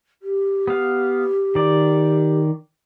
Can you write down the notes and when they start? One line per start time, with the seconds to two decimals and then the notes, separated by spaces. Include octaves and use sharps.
0.22 G4
0.67 B3 F5
1.55 D#3 D5